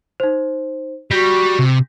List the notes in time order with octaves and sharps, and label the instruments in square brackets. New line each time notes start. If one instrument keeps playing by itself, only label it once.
[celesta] D#4 C5
[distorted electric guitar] G3 [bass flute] F#4 [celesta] G6 A#6 B6
[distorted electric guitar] C3